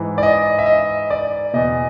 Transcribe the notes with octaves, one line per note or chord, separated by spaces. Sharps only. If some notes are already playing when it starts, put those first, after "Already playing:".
Already playing: G#2 E3
D5
D#5
E5
D#5
D5
E2 B2 D#5